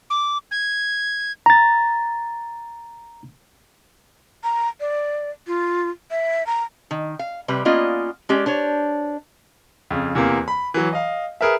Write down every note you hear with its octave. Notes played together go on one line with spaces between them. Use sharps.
D6
G#6
A#5 A6
A#5
D5
F4
E5
A#5
D#3
F5
C3 G3 B4
A#3 B3 C#4 F4 D5 D#5
G#3 C#4 G4 D5
D4 C5 C#5
F2 C#3
E2 C3 E3 A#3
B5
E3 F#3
D#5 F5
G#4 A#4 B4 E5